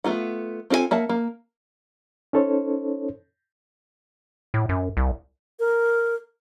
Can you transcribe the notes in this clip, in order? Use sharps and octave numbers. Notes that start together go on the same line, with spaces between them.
A3 B3 F4 F#5
C4 F4 A4 C#5 G#5
A#3 E5 F#5 A5
A#3
C#4 D#4 A4 C5 C#5
A2
F#2
C2
A#4